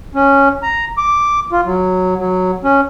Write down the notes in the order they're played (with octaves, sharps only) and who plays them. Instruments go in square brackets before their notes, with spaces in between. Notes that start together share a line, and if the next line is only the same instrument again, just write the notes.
[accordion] C#4
A#5
D6
F4
F#3
F#3
C#4